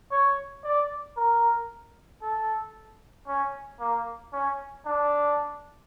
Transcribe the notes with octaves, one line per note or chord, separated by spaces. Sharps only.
C#5
D5
A#4
A4
C#4
A#3
C#4
D4